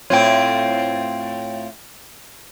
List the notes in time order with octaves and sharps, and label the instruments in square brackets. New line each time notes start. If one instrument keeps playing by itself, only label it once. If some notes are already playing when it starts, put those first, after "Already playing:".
[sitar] A2 C4 F4 [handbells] C#5 G5